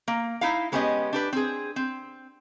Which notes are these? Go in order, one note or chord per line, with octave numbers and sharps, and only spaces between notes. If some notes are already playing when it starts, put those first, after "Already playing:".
A#3
D#4 E4 F5
G#3 B3 C#4 G4 A4 D#5
D4 G4 B4
C4 G#4
C4